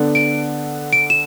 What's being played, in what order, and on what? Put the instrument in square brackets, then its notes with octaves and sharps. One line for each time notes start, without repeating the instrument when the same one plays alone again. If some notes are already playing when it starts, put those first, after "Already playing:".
Already playing: [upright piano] D3 B3 D4 A4
[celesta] D7
D7
E7